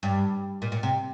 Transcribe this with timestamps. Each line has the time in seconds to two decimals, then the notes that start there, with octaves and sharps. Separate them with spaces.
0.03 G2
0.62 A#2
0.72 A#2
0.83 C3